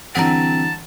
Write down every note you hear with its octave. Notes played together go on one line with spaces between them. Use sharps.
D3 E3 G3 C4 F#5 A5 A#5